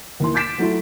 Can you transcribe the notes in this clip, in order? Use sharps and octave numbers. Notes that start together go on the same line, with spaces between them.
D#2 E3 C6
D6 G6 A6 B6 D7 E7
F#3 A3 E4 F4